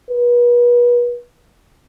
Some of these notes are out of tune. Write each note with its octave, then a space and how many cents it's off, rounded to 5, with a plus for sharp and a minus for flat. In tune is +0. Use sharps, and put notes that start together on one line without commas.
B4 -35